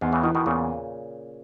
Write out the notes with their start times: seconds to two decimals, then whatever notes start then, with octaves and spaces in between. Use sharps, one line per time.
0.01 E2 G#2
0.12 C#3 E3
0.23 B2 D#3 E3
0.35 B2 D#3
0.46 E2 A#2 C#3